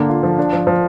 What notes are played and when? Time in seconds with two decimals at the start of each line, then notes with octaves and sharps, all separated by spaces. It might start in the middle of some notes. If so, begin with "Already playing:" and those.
Already playing: D3 A#3
0.09 F4
0.23 F3
0.38 D4
0.53 F3
0.67 F3